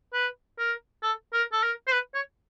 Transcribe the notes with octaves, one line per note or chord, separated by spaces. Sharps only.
B4
A#4
A4
A#4
A4
A#4
C5
B4
C#5